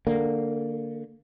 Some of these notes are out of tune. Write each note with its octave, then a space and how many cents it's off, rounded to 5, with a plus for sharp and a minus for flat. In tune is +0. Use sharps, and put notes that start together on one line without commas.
D3 +0 A#3 -10